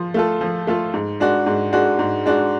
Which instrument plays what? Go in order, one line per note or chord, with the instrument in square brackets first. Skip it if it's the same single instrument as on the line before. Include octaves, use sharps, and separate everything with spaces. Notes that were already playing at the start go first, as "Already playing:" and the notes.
Already playing: [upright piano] F3 F4
A3 F4 A4
F3
A3 F4 A4
G#2
G#3 D4 F#4
G#2
G#3 D4 F#4
G#2
G#3 D4 F#4